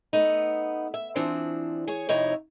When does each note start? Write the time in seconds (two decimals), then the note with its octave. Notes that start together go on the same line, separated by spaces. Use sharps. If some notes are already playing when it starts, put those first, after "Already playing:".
0.13 A3 B3 D#4
0.94 E5
1.16 E3 F3 C4 D4
1.87 G#4 C#5
2.09 F2 C3 D#4 E4 C#5